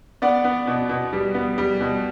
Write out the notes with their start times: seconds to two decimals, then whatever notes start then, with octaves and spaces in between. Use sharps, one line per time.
0.22 B3 D5 F#5
0.44 B3
0.67 B2
0.89 B2
1.13 G3
1.34 B3
1.58 G3
1.80 B2